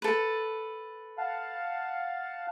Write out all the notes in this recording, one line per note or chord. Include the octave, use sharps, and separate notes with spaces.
A4 B4
F5 F#5 A5